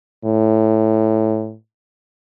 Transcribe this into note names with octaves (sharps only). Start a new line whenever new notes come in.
A2